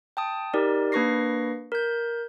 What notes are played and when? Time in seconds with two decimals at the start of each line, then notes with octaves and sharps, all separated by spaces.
0.17 G5 A5 D#6
0.54 D#4 G4 A#4 D5
0.92 A#3 D4 B4 C#6 A#6 C7
1.72 A#4 G6